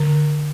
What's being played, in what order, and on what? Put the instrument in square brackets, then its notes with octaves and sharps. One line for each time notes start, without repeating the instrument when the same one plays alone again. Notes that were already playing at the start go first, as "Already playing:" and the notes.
Already playing: [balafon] D3